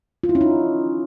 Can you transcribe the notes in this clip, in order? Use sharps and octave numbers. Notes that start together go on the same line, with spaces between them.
F4
E4
C#4
D#4